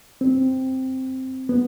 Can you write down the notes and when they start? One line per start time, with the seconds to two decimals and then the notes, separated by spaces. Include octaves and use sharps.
0.21 C4
1.49 B3